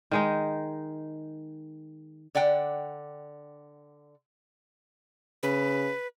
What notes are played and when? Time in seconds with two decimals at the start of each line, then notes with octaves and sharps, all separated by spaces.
0.11 D#3 G#3 D#4
2.35 D3 D5 F#5 G5
5.43 C#3 B4